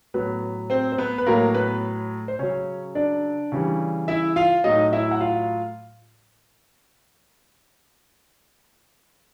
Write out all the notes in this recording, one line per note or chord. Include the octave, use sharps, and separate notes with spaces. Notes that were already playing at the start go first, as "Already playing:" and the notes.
A2 F#3 B3 B4
C4 C5
C5
B3 B4
B4
A2 F#3 A#3 A#4
B3 B4
C5
C#3 F#3 C#4 C#5
D4 D5
C#3 E3 G3
E4 E5
F4 F5
A2 F#3 D#4 D#5
E4 E5
F#5
F4 F5